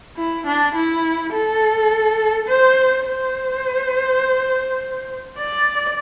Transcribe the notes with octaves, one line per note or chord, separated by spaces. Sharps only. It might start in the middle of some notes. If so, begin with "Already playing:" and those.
E4
D4
E4
A4
C5
C5
D5